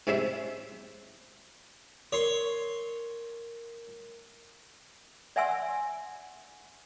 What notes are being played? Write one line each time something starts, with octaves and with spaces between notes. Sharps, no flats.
G#2 C3 C#4 E4 E5 B5
A#4 C#5 C6
D5 E5 F#5 G#5 C6 E6